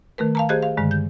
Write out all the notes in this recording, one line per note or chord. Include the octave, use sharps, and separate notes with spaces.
D#3 A3 A#4 B4
F5 A5 A#5
G4 G#4 C5 D#5 F#6 G#6
F5
G2 D3 D#3 G#3
G6